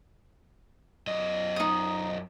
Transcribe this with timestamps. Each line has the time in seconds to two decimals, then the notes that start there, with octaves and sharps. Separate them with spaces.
1.07 F#2 D#5
1.56 D#4 D#6